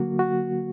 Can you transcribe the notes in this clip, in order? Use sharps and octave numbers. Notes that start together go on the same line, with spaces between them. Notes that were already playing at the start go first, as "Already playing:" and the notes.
Already playing: D3 F#3 A#3 F#4
F#4